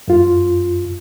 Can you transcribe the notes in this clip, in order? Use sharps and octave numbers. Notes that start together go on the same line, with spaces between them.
F#2 F4